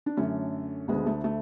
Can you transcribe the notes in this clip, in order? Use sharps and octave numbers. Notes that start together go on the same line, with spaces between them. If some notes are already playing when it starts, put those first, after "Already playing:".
D4
F#2 D3 A3 C#4
D2 D3 G#3 B3
A3
A3